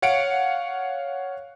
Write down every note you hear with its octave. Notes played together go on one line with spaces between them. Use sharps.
C#5 F5 F#5 C#7 D7